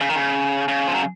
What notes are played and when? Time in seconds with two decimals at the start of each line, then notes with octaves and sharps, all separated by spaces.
0.01 C#3
0.09 D#3
0.16 C#3
0.68 C#3
0.87 F3
0.94 F#3